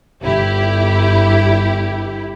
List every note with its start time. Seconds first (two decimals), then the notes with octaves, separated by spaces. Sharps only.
0.24 G1 E4 G4